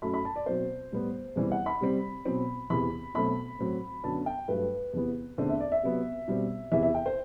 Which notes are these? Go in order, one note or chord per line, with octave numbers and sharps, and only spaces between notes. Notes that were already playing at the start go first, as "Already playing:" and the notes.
F#2 F#3 A3 B5
B5
A5
D5
B2 F#3 C4 C5
A2 G3 B3
E2 C3 E3 G3 C4
F#5
B5
C3 G3 C4
B2 F#3 C4
E2 C3 E3 B5
B2 F#3 A3 C4 B5
A2 F#3 C4
F#2 D3 F#3 B3 A5
G5
G2 F#3 A3 B4
E2 C3 E3 B3
E2 D3 A3 C4 C5
E5
D5
E5
C3 F#3 B3
B2 G3 C4
E2 C3 E3 E5
E5
G5
C5